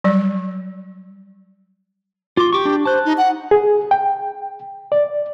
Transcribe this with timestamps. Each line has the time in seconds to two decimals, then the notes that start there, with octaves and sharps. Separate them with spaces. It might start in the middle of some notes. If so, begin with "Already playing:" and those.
0.04 F#3 G3 D5
2.37 F4 C6 D6
2.53 G4 C#6 D6
2.65 D4
2.85 C5 A5 F#6
3.05 D#4
3.17 F#5
3.51 G#4
3.91 G5
4.92 D5